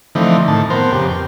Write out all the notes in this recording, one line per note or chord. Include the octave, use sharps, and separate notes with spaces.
D3 E3 F3 A3 C4 D#4
A2 D#3 A5
B3 C4 A#4 C5
F2 C#3 G4 C5
G5